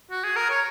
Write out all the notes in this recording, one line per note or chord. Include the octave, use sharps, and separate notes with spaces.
F#4
G#4
A#4
C#5